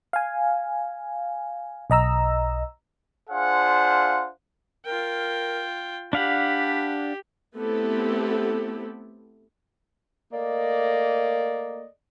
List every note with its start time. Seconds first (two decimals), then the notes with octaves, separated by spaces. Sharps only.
0.13 F5 G#5
1.90 B1 D#5 A#5 E6
3.30 D4 F4 G#4 C5 F5 F#5
4.86 F4 A#4 G5
6.13 D4 G4 F5 F#5 B5
7.55 A3 B3 C4 E4 G4 A4
10.33 A3 A#3 D5 D#5